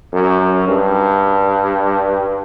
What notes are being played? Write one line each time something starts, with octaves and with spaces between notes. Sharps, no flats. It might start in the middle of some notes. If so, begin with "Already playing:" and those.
F#2
G2